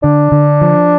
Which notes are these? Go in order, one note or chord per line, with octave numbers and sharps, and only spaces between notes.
D3 D4
D3
F3